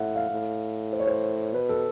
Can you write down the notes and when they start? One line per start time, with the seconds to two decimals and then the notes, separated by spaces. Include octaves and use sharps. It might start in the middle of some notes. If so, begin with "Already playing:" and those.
Already playing: A2 E5 F#5
0.16 F5
0.30 A2
0.93 C5
1.00 C#5
1.07 C5
1.54 B2 B4
1.69 A4